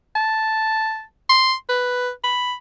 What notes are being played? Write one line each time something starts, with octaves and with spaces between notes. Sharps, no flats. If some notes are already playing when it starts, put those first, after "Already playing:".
A5
C6
B4
B5